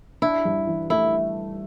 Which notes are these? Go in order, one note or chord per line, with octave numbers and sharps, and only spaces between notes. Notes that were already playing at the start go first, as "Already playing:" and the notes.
D4 E4
G2
E3
A3 E4